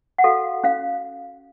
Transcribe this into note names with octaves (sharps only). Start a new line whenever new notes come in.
F#5
F#4 A4 F5
C#4 F5